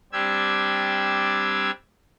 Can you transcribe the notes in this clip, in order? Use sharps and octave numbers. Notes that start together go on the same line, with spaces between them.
G3 C4 D4 G4 E6 G#6